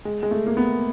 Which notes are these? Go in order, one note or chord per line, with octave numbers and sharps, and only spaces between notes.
G#3
G#3
A3
A#3
B3